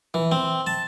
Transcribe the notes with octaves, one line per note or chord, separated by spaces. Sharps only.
E3
C4
A5